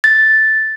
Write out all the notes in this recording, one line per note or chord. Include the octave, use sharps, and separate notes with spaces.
A6